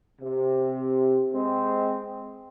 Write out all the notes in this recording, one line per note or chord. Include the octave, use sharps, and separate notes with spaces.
C3
G#3 C4